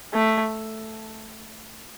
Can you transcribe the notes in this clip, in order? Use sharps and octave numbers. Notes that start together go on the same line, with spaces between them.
A3